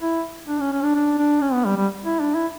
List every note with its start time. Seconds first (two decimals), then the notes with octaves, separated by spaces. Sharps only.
0.01 E4
0.48 D4
0.60 C#4
0.72 C#4
0.83 D4
0.95 D4
1.18 D4
1.41 C#4
1.53 B3
1.65 G3
1.76 G3
2.04 E4
2.20 D4
2.35 E4